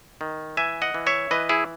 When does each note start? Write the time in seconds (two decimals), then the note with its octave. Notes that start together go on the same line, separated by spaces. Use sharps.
0.21 D#3
0.57 E3 E5 G#5
0.82 D#5 F#5
0.94 E3
1.07 C#5 E5
1.31 E3 B4 D#5
1.49 E4 G#4